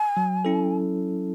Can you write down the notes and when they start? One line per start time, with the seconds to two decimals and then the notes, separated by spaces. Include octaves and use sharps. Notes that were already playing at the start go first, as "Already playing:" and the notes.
Already playing: G#5
0.17 F#3
0.45 C#4 E4 A4